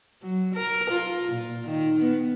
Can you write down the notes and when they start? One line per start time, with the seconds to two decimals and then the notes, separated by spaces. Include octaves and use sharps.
0.22 F#3
0.54 A#4
0.90 F4
1.32 A#2
1.65 D#3
2.01 B3